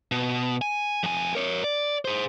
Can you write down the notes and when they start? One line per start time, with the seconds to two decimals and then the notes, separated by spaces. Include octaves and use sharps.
0.12 B2
0.62 G#5
1.03 F2 G#5
1.35 A#4 C#5
1.64 D5
2.05 G#4 C5